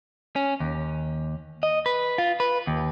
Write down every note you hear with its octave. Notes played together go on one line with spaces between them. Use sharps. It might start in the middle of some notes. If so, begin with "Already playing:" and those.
C#4
D#2
D#5
B4
F4
B4
D#2